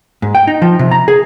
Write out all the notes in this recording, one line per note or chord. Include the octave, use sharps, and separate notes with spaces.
G#2
G5
D#4
F3
C3
A#5
G#4